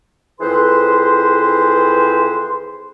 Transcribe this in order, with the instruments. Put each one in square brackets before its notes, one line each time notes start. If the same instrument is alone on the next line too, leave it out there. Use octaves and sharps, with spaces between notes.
[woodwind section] F2 E3 G#4 B4 C5 C6